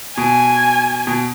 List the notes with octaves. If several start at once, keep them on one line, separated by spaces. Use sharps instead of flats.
B2 G#5
B2